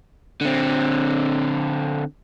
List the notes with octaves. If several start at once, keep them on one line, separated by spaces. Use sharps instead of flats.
D3 C4